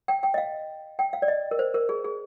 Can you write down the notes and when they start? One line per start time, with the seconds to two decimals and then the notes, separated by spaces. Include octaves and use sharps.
0.08 G5
0.23 G5
0.34 D#5
0.38 F5
0.99 G5
1.13 F5
1.22 D5
1.28 D#5
1.51 A#4
1.59 C5
1.74 A#4
1.89 G#4
2.05 G#4